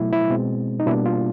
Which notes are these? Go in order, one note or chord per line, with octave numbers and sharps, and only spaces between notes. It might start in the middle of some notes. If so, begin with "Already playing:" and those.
Already playing: B2 F#3 A3 E4
E4
B2 G#3 C4
D#4
B2 G3 A#3 D4 E4
F4